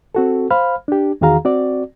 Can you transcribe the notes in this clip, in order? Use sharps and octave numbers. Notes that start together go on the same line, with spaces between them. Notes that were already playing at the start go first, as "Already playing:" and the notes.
C4 F#4 A4
C5 F5 B5 F6
D4 G4
E2 D#3 F#4 G#4 F5 A#5
C4 F#4 D5